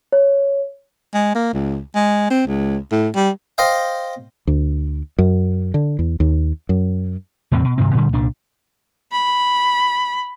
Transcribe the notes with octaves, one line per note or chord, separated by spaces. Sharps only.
C#5
G#3
A#3
C#2
G#3
C4
C#2
A2
G3
C5 D#5 F5 G5
D2
F#2
D3
E2
D#2
F#2
E2 A2 C3 C4
B2
G2 C3 D#3 C4
A#2 D3 G3
C2 A#2 D4
B5